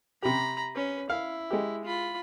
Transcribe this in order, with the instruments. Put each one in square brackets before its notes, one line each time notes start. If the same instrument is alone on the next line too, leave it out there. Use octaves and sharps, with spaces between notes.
[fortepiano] C3 G4 [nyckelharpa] A#5 B5
[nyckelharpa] C#4 B4
[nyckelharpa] E4 [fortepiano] F5
[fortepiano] G#3 G4
[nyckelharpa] F4 B5